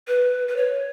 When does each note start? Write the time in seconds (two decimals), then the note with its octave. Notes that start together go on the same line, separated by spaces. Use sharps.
0.08 B4
0.48 B4
0.57 C#5